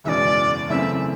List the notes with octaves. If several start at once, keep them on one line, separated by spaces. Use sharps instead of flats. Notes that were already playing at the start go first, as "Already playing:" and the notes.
F#1 E2 B2 G#3 C#4 D5 E5
F#2 C#3 E3 A3 C4 E5